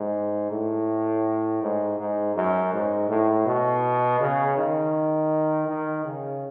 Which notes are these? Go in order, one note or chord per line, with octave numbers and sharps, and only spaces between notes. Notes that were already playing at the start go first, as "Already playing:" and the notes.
Already playing: G#2
A2
G#2
G#2
F#2
G#2
A2
B2
C#3
D#3
D#3
C#3